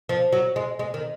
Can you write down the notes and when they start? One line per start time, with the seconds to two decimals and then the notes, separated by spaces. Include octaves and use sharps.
0.09 F3
0.32 F#3
0.56 G#3
0.79 G#3
0.94 D#3